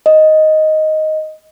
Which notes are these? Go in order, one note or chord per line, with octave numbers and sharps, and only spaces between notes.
D#5